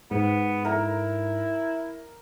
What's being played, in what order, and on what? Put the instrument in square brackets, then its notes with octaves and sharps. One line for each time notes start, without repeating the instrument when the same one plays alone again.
[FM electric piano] G#2 [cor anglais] B3
[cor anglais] E4 [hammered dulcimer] A#4 A#5